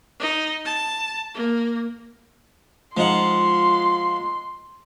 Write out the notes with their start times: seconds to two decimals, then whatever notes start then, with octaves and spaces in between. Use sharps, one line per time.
0.20 D#4
0.65 A5
1.34 A#3
2.97 F3 G#3 D#4 F4 F#5 C6